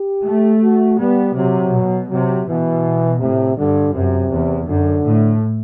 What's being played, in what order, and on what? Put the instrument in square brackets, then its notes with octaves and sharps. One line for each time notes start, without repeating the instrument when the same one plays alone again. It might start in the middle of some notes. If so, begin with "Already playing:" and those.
Already playing: [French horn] G4
[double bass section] A3
[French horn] F#4
[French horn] G3 [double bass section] B3
[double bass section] C3 [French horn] F#3
[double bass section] B2
[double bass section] C3 [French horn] F#3
[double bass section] B2 [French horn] E3
[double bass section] A2 [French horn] C3
[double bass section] G2 [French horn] D3
[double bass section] F#2 [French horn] C3
[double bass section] E2
[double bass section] F#2 [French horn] D3
[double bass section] A2